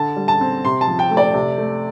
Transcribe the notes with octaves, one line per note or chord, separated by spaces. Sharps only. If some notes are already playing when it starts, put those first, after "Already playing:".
Already playing: D3 A5
G3
A5
C4
C3 C6
A5
F3
G5
A3
D5
C3
A3